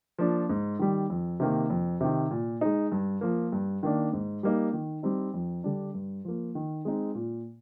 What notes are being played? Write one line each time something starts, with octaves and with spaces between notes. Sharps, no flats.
F3 A#3 D4
G#2
D#3 G3
F2
C3 D#3 A#3
F2
C3 D#3
A#2
G#3 D#4
G2
F3 A#3
G2
D#3 A#3 D4
G#2
G3 A#3 D#4
D#3
G3 C4 D#4
F2
D3 G3 D4
G2
F3 A#3
D#3
G#3 C4 D#4
A#2